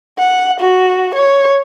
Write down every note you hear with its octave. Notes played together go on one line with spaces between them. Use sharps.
F#5
F#4
C#5